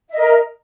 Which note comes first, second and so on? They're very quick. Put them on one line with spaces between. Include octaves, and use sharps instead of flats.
E5 D#5 A#4